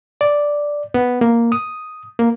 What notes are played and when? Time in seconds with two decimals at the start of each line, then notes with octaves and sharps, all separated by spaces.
0.21 D5
0.94 B3
1.21 A#3
1.52 D#6
2.19 A#3